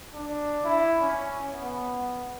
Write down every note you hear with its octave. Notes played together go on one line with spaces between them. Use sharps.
D4
E4
C#4
B3